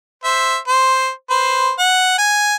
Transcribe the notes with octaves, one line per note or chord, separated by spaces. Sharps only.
C5 E5
C5
B4 C5
F#5
G#5